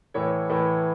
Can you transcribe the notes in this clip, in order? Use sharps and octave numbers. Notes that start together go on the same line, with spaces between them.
A2 E3 C#5
A2 E3